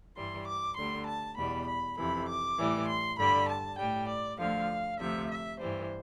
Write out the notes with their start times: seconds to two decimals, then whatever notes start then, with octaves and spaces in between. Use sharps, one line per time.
0.16 G2 E3 G3 C6
0.47 D6
0.77 D2 D3 G3 C6
1.06 A5
1.37 E2 B2 G3 B5
1.67 B5
1.97 F2 C3 E3 B5
2.27 D6
2.58 A2 E3 G3
2.88 C6
3.18 G2 D3 G3 B5
3.49 A5
3.78 A2 G3 G5
4.09 D5
4.39 D2 D3 F3 F5
4.99 D2 C3 F3 E5
5.30 E5
5.59 G2 E3 G3 C5